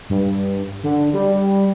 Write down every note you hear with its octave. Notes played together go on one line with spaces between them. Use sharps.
G2
D3
G3